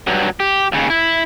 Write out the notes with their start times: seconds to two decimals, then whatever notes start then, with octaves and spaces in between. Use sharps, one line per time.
0.07 G2 F#3
0.40 G4
0.72 D#2 C#3
0.90 E4